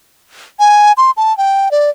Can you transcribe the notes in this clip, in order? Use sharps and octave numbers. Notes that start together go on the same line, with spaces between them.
G#5
C6
A5
G5
D5